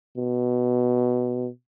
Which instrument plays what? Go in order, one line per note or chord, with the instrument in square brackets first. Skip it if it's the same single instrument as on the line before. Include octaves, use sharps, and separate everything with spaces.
[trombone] B2